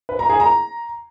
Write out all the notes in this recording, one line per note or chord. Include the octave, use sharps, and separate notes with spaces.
B4
A#5
G#4
A#5